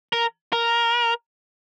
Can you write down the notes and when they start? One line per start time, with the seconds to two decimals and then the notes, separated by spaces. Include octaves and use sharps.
0.13 A#4
0.53 A#4